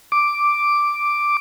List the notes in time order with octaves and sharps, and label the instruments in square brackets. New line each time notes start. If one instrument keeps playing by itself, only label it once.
[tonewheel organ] D6